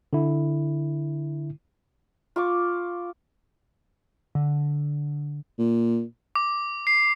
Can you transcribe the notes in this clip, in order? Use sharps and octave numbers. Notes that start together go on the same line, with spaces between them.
D3 E4
F4 C#6 D6
D3
A#2
D6
C7